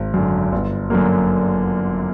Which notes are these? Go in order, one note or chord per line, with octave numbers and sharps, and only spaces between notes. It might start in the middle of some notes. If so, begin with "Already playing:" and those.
Already playing: G#1
F#2 D3
G1
F#2 D3 F#3 A#3